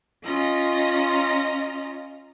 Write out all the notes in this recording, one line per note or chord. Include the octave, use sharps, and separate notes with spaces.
C#4 F4 D#5 A#5